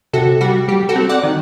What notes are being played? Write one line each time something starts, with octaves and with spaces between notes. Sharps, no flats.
C3 F#4 A4
G3 F#4
G3 G4
F#4 A4
C4
D5 F#5
D#3